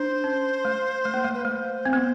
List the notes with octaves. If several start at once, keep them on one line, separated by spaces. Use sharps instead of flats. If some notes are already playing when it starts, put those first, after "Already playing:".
Already playing: D4 C5
C#4
A3
A3
A#3
A3
B4
A3 C5
C4
B3